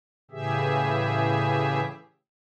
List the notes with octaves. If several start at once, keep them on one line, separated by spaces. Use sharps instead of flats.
A2 C#3 E3 G4 G#4 E5